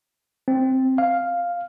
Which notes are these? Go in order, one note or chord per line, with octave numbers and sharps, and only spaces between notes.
C4
F5